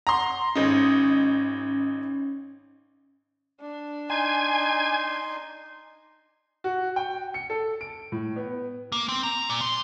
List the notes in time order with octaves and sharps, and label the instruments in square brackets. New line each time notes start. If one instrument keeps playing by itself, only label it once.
[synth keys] F#5 [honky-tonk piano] A#5 C6
[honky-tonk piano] G#1 D#4 [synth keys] C#4
[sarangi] D4
[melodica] D#4 C6 [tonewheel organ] G#5
[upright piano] F#4
G5
C#7
A4
D7
A2
B3
[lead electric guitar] A#3
C4
A#5
A#2
C6